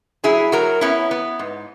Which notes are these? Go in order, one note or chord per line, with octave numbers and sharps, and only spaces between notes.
F#3 E4 G#4
F#3 F#4 A#4
B3 C#4 E4
B3
G#2